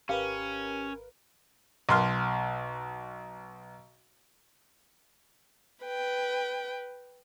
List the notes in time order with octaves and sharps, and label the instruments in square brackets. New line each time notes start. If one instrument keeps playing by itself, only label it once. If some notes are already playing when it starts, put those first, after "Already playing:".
[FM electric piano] G#1 A#4 B4 [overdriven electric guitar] C#4 [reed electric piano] G4 [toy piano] F5 A#5
[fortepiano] B1 C6 F6
[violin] B4 G5